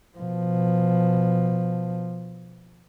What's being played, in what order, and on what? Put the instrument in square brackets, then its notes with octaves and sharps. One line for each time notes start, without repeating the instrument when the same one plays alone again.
[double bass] B2 F3